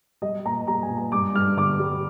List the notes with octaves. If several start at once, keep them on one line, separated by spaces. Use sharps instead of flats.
G3 D#5
A#2 A#5
G3 A#5
G#5
A#2
A#5
G2 D6
G2 F6
D3 D6
G3